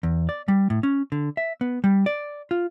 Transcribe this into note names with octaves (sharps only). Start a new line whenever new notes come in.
E2
D5
G3
A2
C#4
D3
E5
B3
G3
D5
F4